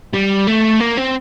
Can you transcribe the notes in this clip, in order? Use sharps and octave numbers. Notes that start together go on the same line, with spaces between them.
G3
A3
A#3
C4